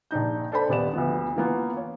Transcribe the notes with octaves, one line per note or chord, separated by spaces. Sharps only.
A#1 D4 D#4 G6
D4 A4 C5 B5
D#1 B3 D5 E7
D2 F3 B3
E3 A#3 B3 F4
C#5